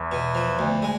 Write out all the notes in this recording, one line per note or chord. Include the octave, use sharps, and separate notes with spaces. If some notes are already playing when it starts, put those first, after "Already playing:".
Already playing: E2 E3
B2
F3
D2
G#3